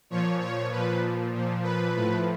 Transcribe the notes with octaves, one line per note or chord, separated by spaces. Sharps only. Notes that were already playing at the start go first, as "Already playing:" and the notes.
A#2 F3 C#5
C#5
A#2 F3 B4
A#2 F3
B4
A2 F3